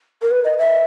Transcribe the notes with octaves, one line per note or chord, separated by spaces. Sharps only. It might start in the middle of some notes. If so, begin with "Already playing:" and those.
A#4
B4
D#5
E5